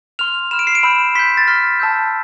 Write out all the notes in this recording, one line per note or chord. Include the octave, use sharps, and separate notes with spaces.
C6 F6 F7
B5 F6 E7
D7
C7
D7
B5 E6 G6 E7
C6 G6 B6
A6
C6 F6 B6
A5 E6 G6